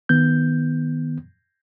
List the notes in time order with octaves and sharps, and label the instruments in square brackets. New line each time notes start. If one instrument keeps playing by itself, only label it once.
[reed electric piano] D#3 B3 G6